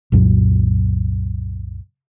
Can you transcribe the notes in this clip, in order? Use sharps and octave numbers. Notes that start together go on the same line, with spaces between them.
C2 F#2 A#2 F#3